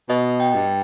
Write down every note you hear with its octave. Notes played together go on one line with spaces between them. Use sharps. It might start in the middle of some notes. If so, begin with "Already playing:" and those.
B2 D#5
G5
G2